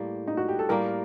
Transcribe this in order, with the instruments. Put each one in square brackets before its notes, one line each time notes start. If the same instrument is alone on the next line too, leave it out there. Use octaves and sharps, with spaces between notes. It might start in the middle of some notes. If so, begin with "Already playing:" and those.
Already playing: [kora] A2 G3 A#3
[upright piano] D#4
F#4
G4
A4
[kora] A2 G3 A#3 [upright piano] A#4